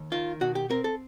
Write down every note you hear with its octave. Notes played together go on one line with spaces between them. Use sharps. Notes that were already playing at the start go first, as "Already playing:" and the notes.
Already playing: D#2
D#3 F4
B2 F#4
G4
C4 A#4
A4